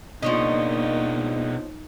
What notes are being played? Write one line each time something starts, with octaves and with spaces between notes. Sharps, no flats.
B2 F3 A#3 D4 D#4 C#5 D#5